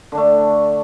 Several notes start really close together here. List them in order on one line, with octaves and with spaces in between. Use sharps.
D3 D4 A3